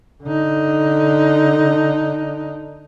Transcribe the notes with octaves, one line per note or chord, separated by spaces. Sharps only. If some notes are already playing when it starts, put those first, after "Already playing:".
D3 D#4